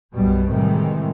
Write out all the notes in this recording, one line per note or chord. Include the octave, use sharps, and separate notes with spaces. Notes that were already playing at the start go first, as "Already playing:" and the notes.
B1 F#2 B2 G3
A2 C3 D#3 E3 G3 G#3